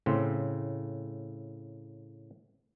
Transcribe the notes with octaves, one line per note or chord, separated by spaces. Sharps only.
A2 C#3 C4